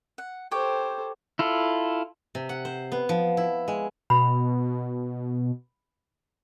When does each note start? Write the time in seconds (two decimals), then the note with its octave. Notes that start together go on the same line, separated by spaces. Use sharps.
0.18 F#5
0.51 G4 A4 C5 C#5 G5
1.39 E4 F4 A4
2.35 C3
2.49 F#5
2.65 C5
2.92 B3
3.09 F3
3.37 E4
3.68 G#3
4.10 B2 B5